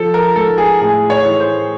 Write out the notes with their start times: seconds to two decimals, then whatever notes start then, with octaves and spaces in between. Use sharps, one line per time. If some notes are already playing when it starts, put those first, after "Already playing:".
Already playing: F3 A4
0.14 A#4
0.36 G#2 A4
0.58 G#4
0.81 A2 G#4
1.10 C#5
1.25 E3
1.40 C5